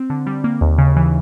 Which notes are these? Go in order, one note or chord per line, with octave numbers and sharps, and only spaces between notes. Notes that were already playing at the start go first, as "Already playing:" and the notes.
Already playing: C4
D3
G3
A#3
D#2
C#3
E3